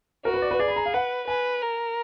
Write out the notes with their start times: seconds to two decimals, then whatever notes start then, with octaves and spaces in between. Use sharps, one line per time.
0.25 F#4 A#4
0.34 B4
0.42 D5
0.51 B4
0.59 G#4 D5
0.68 B5
0.76 A#5
0.86 F5
0.94 B4 F#5
1.27 B4 G#5
1.62 A#4